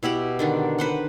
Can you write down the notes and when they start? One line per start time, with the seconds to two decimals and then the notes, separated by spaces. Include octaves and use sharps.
0.03 B2 E4 G4 F#5
0.39 D3 D#3 D4
0.78 B4 C5 F#5